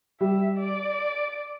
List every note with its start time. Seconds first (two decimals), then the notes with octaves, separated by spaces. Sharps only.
0.21 G3 E5
0.58 D5